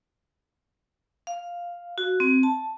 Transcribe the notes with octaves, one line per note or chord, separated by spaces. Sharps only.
F5
F#4
C4
A5